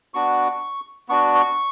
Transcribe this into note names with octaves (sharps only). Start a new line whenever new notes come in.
B3 D4 F#4 C#6
B3 D4 F#4 C#6
C#6